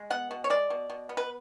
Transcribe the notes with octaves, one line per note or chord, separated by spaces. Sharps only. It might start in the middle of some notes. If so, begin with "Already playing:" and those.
Already playing: G#3
B3 F#5
B2
C#5
G#3 D5
B2
B2
B3
B4